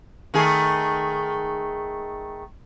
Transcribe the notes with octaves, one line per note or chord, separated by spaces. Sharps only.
D#3 A3 G#4